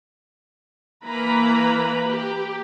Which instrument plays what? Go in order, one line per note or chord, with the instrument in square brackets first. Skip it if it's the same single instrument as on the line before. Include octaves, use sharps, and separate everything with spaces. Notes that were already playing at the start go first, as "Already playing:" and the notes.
[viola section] E3 A#3 B4 A#5 B5
G4